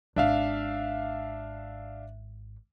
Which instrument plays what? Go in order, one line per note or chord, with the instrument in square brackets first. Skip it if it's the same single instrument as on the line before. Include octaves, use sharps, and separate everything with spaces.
[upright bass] G#1 [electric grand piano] D4 E5 F5